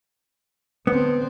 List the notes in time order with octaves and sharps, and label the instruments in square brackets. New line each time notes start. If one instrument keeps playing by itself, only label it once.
[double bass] D3 C4 [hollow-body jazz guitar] B3